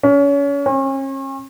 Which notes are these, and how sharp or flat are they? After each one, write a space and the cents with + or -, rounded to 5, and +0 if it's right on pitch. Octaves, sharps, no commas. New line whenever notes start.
C#4 +30
C#4 -40